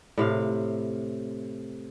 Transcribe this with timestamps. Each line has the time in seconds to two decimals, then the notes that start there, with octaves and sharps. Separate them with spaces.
0.18 A2 C3 F5